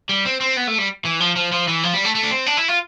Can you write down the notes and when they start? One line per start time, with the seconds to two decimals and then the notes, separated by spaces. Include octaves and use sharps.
0.09 G3
0.25 C4
0.41 C4
0.57 B3
0.67 A3
0.78 G3
1.05 E3
1.20 F3
1.36 F3
1.52 F3
1.68 E3
1.83 F3
1.94 G3
2.05 A3
2.15 A3
2.23 D4
2.31 C4
2.46 D4
2.57 E4
2.68 F4